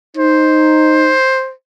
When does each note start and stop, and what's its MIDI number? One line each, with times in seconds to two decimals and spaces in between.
0.17 1.13 63
0.17 1.53 72